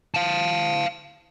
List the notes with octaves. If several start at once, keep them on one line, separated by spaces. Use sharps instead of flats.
F5 A5